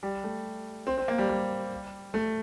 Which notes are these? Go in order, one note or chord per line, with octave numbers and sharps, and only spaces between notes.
G3
A3
C4
C4
A#3
G3
G3
A3